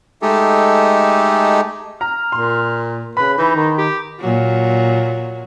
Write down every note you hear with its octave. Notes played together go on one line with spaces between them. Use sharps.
G#3 A3 D#4 G4 A4
A#5 F6
A#2 C6
C#3 B4 B5
E3 D#4
D#3
G4
A#2 F#3